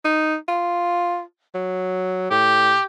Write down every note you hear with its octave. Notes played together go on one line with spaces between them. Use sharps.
D#4
F4
F#3
A2 G4